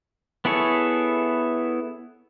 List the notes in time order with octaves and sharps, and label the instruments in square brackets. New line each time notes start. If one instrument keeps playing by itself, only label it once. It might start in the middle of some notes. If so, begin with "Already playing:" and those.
[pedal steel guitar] B3 E4 G#4 A4 C#5